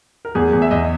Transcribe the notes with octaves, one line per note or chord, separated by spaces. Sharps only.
A#4
E2 G#4
E2
E5
E2 D#5